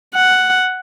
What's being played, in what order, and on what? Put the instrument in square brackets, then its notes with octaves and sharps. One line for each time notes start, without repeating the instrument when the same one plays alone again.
[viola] F#5